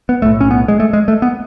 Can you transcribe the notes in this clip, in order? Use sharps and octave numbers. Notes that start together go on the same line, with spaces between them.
B3
B1 A2 A3
C#4
B3
G#3
A3
G#3
A3
B3